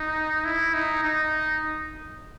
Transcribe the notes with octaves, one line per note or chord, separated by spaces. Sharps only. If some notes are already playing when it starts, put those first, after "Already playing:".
Already playing: D#4
E4
D#4
D#4